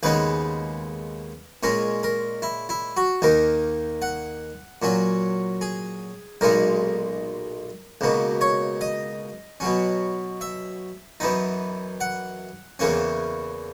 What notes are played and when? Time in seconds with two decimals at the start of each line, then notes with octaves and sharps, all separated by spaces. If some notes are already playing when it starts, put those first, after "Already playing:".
0.03 D#2 C#3 G#3 B3 B4
1.63 A#2 G#3 C#4 A#4
2.03 A#4
2.42 E4
2.69 E4
2.97 F#4
3.22 D#2 D#3 A#3 A#4
4.02 F#5
4.82 A#2 F#3 C#4
5.61 G#4
6.41 B1 A#2 G#3 D#4 A#4
8.01 C#2 B2 A#3
8.41 C#5
8.81 D#5
9.60 B2 F#3 C#4
10.41 E5
11.20 F#2 E3 B3 D#4
12.01 F#5
12.79 E2 C#3 E3 A#3 C#4